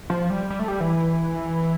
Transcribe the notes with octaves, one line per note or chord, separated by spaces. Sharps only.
F3
G3
G3
A3
G3
E3